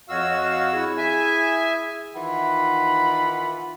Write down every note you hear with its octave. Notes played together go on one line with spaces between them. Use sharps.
F2 F#4 C#5 D#5 F5 E6
E4 G#4
E5 G#5
D#3 E3 F4 F#5 B5